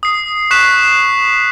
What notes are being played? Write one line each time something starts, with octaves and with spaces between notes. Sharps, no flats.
D#6 C7
C#6 F#6 B6 C7 E7